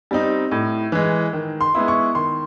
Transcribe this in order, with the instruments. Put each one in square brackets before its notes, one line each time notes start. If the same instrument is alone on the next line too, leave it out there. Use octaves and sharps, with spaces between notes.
[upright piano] G3 C4 D#4
A2
E3 G#3
D#3
C6
G#3 B3 E4
C#6
D#3 C6